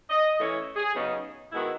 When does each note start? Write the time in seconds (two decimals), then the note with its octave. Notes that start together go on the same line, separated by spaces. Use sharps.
0.10 D#5
0.38 E3 A3 C#4 E4 C#5
0.76 G#4
0.95 C#3 F#3 B3 D#4
1.51 D#3 G#3 B3 E4 F#4